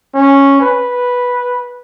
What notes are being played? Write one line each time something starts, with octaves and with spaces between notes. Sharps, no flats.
C#4
B4